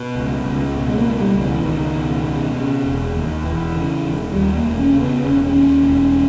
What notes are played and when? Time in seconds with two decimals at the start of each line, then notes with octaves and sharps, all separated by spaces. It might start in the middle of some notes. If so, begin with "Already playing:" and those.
Already playing: B2
0.15 C#2
0.45 C#2
0.76 B2
0.88 G#3
0.98 A#3
1.05 B2
1.20 G3
1.35 C#2
1.42 E3
1.65 C#2 D#3
1.95 B2
2.24 B2
2.55 C#3
2.84 E1
3.14 D#2
3.44 E1 E3
3.74 C#3
4.04 E1
4.33 D#2 G3
4.56 A#3
4.64 E1
4.79 C#4
4.93 C#3
5.01 B3
5.23 E1 C#4
5.47 C#4
5.52 D#2
5.83 E1